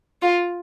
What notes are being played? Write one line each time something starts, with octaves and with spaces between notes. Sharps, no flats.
F4